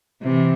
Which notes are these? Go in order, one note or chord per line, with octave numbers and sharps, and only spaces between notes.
C3 E3